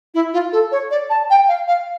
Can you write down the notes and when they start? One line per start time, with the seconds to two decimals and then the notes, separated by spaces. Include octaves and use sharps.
0.14 E4
0.33 F4
0.53 A4
0.72 C#5
0.91 D5
1.10 A5
1.30 G5
1.48 F5
1.68 F5